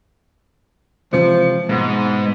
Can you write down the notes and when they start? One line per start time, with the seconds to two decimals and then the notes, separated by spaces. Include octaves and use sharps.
1.13 C3 E3 F3 G#3
1.69 G#2 B2 G#3 A#3 B3